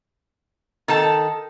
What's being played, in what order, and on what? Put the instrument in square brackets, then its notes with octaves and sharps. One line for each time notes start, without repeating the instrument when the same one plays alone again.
[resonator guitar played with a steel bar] D#3 A4 A5